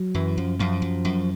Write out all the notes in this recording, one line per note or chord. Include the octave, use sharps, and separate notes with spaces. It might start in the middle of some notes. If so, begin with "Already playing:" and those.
Already playing: F#3
F#2 E3
F#2 F3
F#2 F3
F#2
F#2